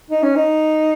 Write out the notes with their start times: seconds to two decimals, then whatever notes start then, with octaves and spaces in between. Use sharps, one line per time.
0.10 D#4
0.23 C#4
0.36 D#4